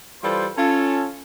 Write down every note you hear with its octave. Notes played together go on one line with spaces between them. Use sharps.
E3 G3 F4 A4 C5
C#4 F4 A4